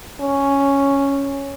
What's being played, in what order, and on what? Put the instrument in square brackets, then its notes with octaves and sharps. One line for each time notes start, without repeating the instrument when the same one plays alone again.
[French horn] C#4